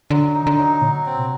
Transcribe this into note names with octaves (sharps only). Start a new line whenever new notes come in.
D3 F#3
D#4
D3
F#3
A#2 F#3
C4
C3